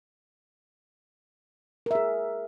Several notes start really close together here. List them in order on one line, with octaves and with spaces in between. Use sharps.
A#4 E5 G#4